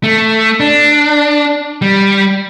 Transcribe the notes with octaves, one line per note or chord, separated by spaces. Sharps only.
A3
D4
G3